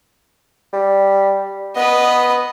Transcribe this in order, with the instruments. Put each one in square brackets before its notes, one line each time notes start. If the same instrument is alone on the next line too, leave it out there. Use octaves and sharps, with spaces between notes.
[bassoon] G3
[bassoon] B3 [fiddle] B4 D#5